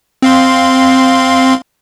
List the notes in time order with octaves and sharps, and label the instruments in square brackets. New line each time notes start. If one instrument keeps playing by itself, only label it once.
[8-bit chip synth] C4 F5 C6